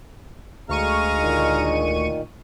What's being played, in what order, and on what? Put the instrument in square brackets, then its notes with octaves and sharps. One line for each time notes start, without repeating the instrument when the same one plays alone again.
[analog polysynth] D2 C#6 D#7 [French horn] G#3 [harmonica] F5 A#5
[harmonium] A#2 D#3